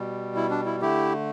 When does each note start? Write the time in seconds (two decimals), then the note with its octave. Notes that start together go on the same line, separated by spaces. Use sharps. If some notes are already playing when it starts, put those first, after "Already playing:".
Already playing: B2 G3
0.36 E4
0.51 D4
0.66 E4
0.82 D3 A3 E4 G4